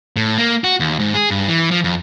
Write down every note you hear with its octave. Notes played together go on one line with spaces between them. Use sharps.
A2
A#3
F#4
D#2
G#2
G#4
G2
E3
F3
F2